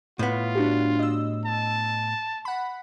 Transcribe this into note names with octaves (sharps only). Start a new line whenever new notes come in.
A2 B3 F4
D4 F#4 G4
D#5 E6
A5
F#5 B5